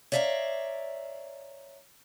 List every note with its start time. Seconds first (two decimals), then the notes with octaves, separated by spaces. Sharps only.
0.12 C#5 D5 E5 F5 G#5 A#5